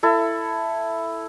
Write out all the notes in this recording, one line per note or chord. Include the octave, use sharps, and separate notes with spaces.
E4 A4